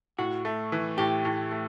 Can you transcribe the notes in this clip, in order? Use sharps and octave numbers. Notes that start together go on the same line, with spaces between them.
A2 F#4
A3
E3
A2 G4
A2
A3